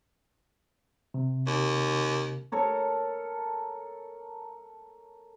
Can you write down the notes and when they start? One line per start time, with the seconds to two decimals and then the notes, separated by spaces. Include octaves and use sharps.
1.14 C3
1.47 D#2
2.52 A4 A#4 C#5 A#5